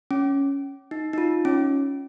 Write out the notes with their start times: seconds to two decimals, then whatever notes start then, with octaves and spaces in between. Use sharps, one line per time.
0.11 C#4
0.91 D#4
1.13 D#4
1.18 F4
1.45 C#4